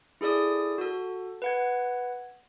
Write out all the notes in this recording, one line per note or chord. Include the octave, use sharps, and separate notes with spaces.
E4 G#4 A4 D5 D#6
F#4 A4
B4 F#5 G#6